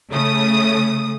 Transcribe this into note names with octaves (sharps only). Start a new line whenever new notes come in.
C#3 A3 D#6